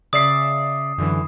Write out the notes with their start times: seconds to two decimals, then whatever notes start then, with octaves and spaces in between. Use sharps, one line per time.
0.13 C#3 D5 E5 D#6 C7
0.98 F#2 D3 E3